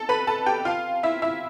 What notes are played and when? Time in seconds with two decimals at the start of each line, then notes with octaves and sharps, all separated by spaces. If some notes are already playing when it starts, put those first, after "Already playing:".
Already playing: A4 A5
0.09 B4 B5
0.27 A4 A5
0.46 G4 G5
0.65 F4 F5
1.03 E4 E5
1.22 E4 E5